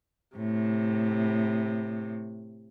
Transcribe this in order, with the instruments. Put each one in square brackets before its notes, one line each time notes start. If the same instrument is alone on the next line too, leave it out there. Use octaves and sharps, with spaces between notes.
[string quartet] A2 C3